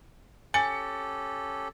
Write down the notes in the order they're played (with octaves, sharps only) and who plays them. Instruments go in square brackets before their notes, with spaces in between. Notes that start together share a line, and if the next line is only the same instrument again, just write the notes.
[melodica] C#4 G4 A4 [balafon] G#5 [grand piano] A6 C#7